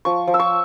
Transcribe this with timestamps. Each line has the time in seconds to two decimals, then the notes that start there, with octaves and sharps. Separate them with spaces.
0.05 F3 C#6
0.27 F3
0.34 E6
0.39 C#6